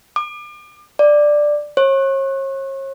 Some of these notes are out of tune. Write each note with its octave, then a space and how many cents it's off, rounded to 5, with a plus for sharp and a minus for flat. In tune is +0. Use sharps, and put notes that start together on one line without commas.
D6 +40
D5 +5
C#5 -40